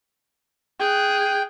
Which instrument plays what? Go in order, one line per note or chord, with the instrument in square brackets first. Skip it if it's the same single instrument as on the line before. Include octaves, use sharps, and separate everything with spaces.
[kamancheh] G#4 F#6 [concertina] G5